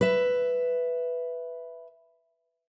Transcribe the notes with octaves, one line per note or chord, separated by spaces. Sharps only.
B4 E5